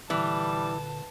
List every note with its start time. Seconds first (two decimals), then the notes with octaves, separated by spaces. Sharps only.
0.10 A#2 D3 E3 G3 A5